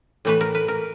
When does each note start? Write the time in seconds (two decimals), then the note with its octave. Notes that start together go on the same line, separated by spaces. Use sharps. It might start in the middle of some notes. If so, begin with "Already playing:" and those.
0.25 A2 E3 A3 B4
0.41 A#4
0.55 B4
0.68 A#4